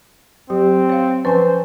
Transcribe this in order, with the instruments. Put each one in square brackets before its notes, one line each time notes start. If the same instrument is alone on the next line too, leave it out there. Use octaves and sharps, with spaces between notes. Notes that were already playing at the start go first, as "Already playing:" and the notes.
[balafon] F#3 [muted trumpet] C4 [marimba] G4
[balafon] C#5 F5
[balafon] F3 C#4 [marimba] B4 G#5 A5 [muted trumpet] C5